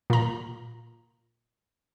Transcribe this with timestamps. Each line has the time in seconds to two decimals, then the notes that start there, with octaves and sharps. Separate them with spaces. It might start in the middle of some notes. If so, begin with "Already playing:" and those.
0.10 A#2 A#5